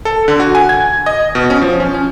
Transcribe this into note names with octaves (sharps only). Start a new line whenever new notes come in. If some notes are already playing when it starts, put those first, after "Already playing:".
A4
D3
F#4
G#5
G#6
D#5
B2
C#4
F3
C#4
C#4